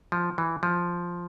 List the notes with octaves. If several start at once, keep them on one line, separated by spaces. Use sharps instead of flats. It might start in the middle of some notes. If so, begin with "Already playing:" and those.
F3
E3
F3